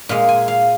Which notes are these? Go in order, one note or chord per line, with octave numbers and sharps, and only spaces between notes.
A#2 G#3 F5
G#5
F5